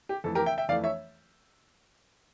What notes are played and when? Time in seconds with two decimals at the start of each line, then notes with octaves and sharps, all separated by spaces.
0.09 G4
0.24 F2 E3 A3 A4
0.35 G4 A#4
0.46 E5 G5
0.58 E5 G5
0.68 F2 E3 A3 D5 F5
0.84 C#5 E5